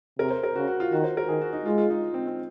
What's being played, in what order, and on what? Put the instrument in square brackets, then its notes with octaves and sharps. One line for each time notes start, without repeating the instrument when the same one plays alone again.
[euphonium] C3 [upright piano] A#4
[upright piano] C5
A#4
[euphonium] C#3 [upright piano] F#4
[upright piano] F#4
F4
[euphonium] D#3 [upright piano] F#4
[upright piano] C5
A#4
[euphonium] D#3 [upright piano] G#4
[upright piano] F#4
D#4
[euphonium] G#3 [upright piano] F4
[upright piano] F4
D#4
C4
C4